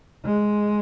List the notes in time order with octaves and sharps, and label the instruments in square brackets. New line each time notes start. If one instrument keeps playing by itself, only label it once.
[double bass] G#3